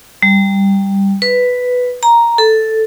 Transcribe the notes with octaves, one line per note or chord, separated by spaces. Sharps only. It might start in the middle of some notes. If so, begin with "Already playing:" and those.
G3
B4
A#5
A4